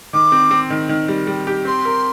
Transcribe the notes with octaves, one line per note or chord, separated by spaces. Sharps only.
D#3 D6
C4
C4
D#3
D#3
G3
G3
G4
C4 C6
A#4